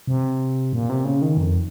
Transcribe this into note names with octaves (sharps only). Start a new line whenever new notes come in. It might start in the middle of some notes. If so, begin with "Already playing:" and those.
C3
A#2
C3
C#3
D#3
F2